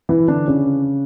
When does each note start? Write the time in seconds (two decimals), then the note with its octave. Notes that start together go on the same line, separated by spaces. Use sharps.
0.09 E3 E4
0.28 D3 D4
0.48 C#3 C#4